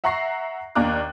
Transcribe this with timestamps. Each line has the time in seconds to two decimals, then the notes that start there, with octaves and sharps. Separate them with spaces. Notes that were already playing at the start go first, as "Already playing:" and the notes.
0.04 E5 F#5 A#5 C#6 A#6 C7
0.75 D#2 A#3 D4 A#5 D6 F#6